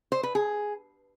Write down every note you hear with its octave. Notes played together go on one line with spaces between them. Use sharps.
C5
B4
G#4